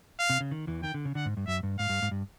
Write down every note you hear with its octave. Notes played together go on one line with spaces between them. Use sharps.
F5
C3
C#3
D#3
E2 E3
D#3 G5
D3
C#3
D3 F#5
G#2
G2
F#2 E5
G2
G#2 F5
G2
G#2
G2